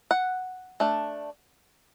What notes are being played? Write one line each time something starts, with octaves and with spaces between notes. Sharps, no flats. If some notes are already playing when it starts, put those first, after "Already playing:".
F#5
A3 D4